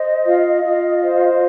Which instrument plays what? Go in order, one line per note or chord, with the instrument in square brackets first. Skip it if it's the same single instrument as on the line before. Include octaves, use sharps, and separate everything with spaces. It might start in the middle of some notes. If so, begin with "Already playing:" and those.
Already playing: [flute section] C5 D#5
F4
F4
C5